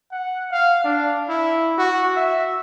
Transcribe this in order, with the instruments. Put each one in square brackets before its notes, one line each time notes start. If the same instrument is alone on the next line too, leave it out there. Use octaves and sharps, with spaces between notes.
[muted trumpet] F#5
F5
D4
E4
F#4
E5